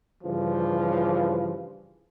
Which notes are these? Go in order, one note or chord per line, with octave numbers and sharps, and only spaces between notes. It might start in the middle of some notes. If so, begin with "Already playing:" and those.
G2 C#3 E3 F3